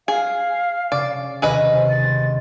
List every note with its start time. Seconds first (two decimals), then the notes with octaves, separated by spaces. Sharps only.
0.08 G#4 F5
0.92 C#3 D5
1.42 D#2 C3 D#3 G#4 B4 D#5
1.73 C5
1.89 A6
2.01 G#3 C4